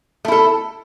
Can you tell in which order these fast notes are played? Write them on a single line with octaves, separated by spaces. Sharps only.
A3 E4 A4